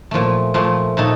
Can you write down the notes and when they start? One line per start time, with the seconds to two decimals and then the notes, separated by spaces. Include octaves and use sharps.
0.11 A#2 F3 A3
0.54 A#2 F3 A3
0.97 A#2 A3 D#4 A4